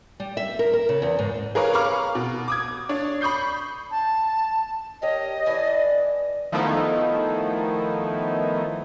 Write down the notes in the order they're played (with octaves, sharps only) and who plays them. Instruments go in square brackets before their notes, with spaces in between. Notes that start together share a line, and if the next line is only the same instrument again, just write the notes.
[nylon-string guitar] G3
E5
A#4
A#4
C#3
E2
G#2
[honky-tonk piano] G#4 A#4 B4 C#5 F5
F5 A#5 B5 C#6 D6 F6
B2
D6 D#6 G#6
D4 C#5 D5
B5 C#6 D#6 G6 C7
[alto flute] A5
[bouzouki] C#4 G4 A#4 [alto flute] D#5
[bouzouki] E3 D4 G#5
[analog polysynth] D#3 F3 A3 B3 D#4 E4